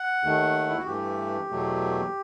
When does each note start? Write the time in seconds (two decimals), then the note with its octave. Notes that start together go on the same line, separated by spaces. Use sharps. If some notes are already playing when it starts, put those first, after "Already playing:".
Already playing: F#5
0.24 D#2 D#3 A3
0.69 E4
0.79 F#4
0.86 G2 E3 A3 G4
1.50 E2 B2 F#3 A3